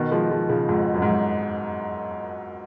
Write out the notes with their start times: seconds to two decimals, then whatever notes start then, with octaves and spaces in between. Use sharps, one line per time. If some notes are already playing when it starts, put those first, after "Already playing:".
Already playing: B2 D#3
0.11 F3 G#3
0.31 F3 G#3
0.49 C#3 F3
0.69 F2 G#2
0.94 F#2
1.02 G#2
1.09 F#2